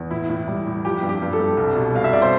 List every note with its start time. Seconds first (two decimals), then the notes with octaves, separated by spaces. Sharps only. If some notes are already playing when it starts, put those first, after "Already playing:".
Already playing: E2
0.11 A2 E4
0.29 A2
0.48 G3
0.66 A2
0.84 F3 G4
1.02 G2
1.09 G4
1.22 G2
1.33 A4
1.40 G2
1.57 C2
1.76 B2
1.95 C2 F5
2.04 E5
2.13 C2 D5
2.22 C5